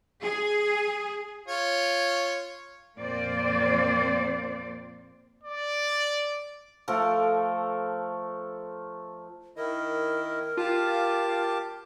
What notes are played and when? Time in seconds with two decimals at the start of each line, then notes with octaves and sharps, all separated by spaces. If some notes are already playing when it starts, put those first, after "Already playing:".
0.22 G#4
1.48 F4 C#5
2.97 F2 A#2 A#3 C4 C5 D5
5.44 D5
6.88 F3 A3 A4 A#4
9.57 D#3 E4 A#4 D#5
10.57 F4 G4 A5 D6